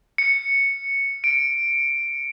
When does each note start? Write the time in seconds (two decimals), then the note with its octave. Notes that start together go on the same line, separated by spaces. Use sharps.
0.18 C#7
1.24 D7